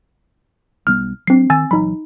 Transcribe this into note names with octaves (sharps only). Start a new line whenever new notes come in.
B1 G3 B3 F6
F#3 C4 D4 C7
D#3 G#5 E6 A6
A#1 E3 F#3 D#4 B5